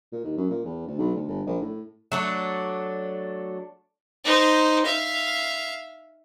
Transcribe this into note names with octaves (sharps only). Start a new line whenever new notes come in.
A#2
D#2
F#2
A#2
E2
D2
B1
D2
G1
A#1
A2
F#3 A3 D4
D#4 C5
E5 F5